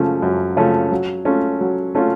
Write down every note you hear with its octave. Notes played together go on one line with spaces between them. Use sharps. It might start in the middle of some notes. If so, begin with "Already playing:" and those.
Already playing: F#2 C#3 F3 A3 C#4
F#2
C#3 F3 A3 C#4
F#3
A3 C#4 F4
F#3
A3 C#4 F4